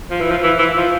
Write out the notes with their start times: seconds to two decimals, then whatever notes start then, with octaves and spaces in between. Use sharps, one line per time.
0.11 F3
0.20 E3
0.30 F3
0.43 E3
0.59 E3
0.76 F3